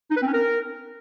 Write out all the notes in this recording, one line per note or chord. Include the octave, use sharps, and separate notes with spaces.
D#4
B4
C4
C#4
A#4